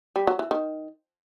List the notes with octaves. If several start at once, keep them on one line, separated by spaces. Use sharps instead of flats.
G3
F#3
E3
D#3